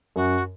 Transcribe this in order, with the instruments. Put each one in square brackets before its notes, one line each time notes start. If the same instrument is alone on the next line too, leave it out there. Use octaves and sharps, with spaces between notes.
[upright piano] F#2 [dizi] F#4